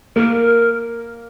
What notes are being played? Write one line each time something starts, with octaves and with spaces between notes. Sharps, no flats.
A#3 A#4